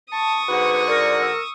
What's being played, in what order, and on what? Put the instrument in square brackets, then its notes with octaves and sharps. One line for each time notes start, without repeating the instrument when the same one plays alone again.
[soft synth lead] A5 [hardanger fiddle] C#6 D#6
[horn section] G#2 D3 F#4 [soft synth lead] B4
[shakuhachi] A#4 [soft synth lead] D5
[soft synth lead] E6